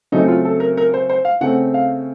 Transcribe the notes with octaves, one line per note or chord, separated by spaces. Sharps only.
C#3 F#3 A3 C4 D#4
F4
A4
A#4
A#4
C5
C5
F5
C#3 A3 C4 F#5
F5